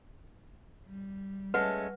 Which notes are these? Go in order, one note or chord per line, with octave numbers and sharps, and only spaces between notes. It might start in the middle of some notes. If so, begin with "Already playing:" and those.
G3
G#3 A3 C#4 B4 F#5